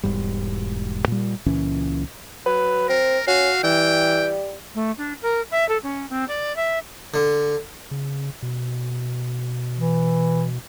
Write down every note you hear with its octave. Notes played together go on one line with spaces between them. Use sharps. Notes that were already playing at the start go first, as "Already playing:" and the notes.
E1 G#2 G3
A#2 G3
C#2 A#2 E3 C#4
F#3 B4
C4 A#4
C#4 F#4 F5
E3 G3 G5
A3
D4
A#4
E5
A4
C#4
C4
D5
E5
D3
C#3
B2
E3